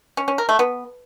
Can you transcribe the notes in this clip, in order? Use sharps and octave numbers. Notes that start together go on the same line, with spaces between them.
C#4
C#4
A#4
A3
B3